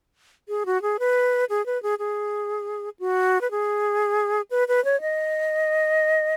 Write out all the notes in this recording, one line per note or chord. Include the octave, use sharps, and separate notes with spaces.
G#4
F#4
G#4
B4
G#4
B4
G#4
G#4
F#4
B4
G#4
B4
B4
C#5
D#5